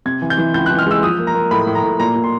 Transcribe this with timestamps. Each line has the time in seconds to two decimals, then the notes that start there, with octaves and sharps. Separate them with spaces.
0.06 C3 G#6
0.22 E3
0.30 G6
0.38 E3
0.54 C#2 G6
0.66 F#6
0.70 E3
0.78 F6
0.86 G#3 E6
1.03 F3 D#6
1.19 A#3
1.27 A#5
1.35 A#3
1.51 A2 B5
1.67 A2
1.75 A#5
1.83 A2
2.00 A#2 A#5
2.15 A#2
2.24 C6